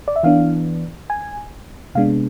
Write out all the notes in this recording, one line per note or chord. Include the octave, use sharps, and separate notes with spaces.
D5
E5
E3 B3 D4 F5
G#5
C3 G#3 B3 D4 F5